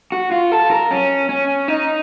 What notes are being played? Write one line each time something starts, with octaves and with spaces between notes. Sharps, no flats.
F#4
F4
A4
A#4
C#4
C#4
D#4